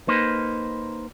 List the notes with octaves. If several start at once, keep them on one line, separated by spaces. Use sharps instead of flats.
A#3 D#4 B4 C5